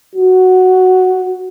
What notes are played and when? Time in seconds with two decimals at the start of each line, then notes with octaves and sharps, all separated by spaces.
0.15 F#4